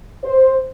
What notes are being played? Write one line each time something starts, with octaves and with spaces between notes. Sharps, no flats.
C5